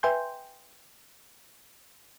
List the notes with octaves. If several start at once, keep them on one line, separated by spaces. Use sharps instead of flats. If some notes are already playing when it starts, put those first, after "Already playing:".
B4 E5 G5 G#5 C6 G6